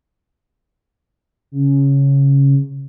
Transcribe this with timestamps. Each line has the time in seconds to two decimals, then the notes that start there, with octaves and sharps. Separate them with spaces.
1.52 C#3